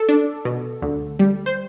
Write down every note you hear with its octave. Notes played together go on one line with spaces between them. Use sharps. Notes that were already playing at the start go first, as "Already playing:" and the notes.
Already playing: A4
D4
B2
D2
G3
C5